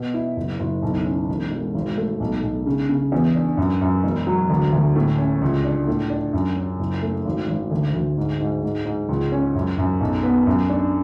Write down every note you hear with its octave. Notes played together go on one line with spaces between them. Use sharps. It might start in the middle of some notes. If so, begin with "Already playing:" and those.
Already playing: B2 B3
E4
F#1
F#1
B1
C#4
E1
E1
G#1
A3
B1
B1
C#3
C#3
E2
D4
F#2
F#2
E1
F#3
D2
D2
A2
C#4
C#2
D4
A2
D4
F#2
C#4
F#1
A3
G#1
G#1
D2
D2
G#2
G#2
G#2
G#2
C#2
C#4
F#2
F#2
B1
B3
F#2
D4